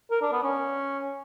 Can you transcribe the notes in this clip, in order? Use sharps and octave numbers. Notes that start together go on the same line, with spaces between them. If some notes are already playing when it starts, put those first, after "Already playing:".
A#4
D4
B3
C#4